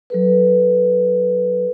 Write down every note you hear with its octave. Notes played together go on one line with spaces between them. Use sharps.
F#3 A4 B4